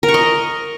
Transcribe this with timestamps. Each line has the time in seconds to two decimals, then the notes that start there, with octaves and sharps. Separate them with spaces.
0.03 A#4
0.09 C#6
0.14 D#5